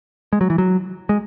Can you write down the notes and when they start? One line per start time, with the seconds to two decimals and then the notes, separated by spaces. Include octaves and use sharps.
0.33 G#3
0.41 F#3
0.50 E3
0.58 F#3
1.09 G#3